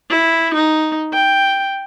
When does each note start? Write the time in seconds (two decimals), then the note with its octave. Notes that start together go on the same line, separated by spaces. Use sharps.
0.10 E4
0.54 D#4
1.13 G5